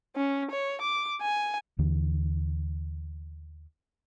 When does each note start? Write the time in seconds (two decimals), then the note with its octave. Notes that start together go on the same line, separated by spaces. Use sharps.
0.16 C#4
0.51 C#5
0.81 D6
1.21 G#5
1.79 D#2 D3 E3